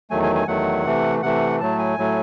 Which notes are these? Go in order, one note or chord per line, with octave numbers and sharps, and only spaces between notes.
E2 D#3 F#3 A3 G#5
G#5
G#5
E2 D#3 F#3 A3 F#5
C3 E3 A3
C3 E3 A3 F#5
A2 F#3 A3 A5
G#5
A2 F#3 A3